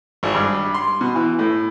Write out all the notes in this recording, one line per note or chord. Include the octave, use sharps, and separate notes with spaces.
G#1
G2
C6
B2
E3
A2